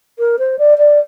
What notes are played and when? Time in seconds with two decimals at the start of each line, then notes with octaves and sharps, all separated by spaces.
0.19 A#4
0.39 C5
0.58 D5
0.78 D5